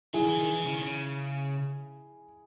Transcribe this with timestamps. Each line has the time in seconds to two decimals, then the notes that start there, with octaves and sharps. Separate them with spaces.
0.14 F#3 E4 G#4
0.23 D#3
0.27 E3
0.39 D#3
0.52 E3
0.64 C#3
0.73 D#3
0.81 C#3